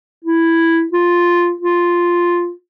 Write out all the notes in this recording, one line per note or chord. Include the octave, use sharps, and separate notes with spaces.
E4
F4
F4